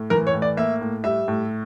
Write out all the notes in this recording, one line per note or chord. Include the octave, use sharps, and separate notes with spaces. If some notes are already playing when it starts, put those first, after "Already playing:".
Already playing: A2
E3 A#4
C#5
A2
D5
A#3 E5
A2
G3 E5
A2